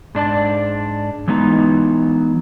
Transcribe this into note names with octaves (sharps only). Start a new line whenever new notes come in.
G#2 D4 D5 A5
E3 F#3 G#3 B3 D#4